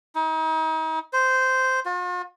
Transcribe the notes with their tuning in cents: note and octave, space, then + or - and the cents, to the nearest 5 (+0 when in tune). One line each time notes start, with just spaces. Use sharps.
D#4 +40
C5 -10
F4 +45